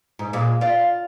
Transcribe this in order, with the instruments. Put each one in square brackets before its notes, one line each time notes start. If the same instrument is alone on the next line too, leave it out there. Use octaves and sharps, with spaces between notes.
[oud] G#2
A#2 G#3
F4 D5